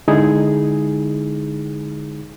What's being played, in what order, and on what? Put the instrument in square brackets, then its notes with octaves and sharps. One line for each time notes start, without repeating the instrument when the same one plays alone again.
[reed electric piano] D3 G#3 D#4 E4 G#4